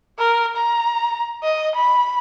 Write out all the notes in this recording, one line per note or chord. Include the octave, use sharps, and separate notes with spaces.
A#4
A#5
D#5
B5